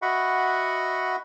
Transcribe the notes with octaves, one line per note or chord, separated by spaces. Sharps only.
F#4 D#5 E5 F#5 B5 C#6